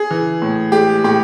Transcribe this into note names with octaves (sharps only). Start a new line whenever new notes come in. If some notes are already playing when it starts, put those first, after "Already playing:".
Already playing: G#4
E3
A2
G#3 G4
A2 G4